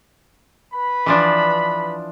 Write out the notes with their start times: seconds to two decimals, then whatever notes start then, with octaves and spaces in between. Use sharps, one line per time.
0.74 B4 B5
1.06 E3 F3 D4